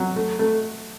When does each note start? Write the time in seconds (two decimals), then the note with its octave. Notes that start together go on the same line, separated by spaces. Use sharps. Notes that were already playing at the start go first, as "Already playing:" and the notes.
Already playing: F#3
0.16 A3
0.39 A3